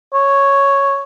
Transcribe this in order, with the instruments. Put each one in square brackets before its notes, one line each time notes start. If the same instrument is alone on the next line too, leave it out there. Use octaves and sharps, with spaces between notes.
[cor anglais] C#5